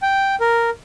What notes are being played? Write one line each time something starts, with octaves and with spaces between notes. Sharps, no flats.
G5
A#4